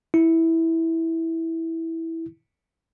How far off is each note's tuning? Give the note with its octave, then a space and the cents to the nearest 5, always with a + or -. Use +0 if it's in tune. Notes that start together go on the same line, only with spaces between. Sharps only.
E4 -10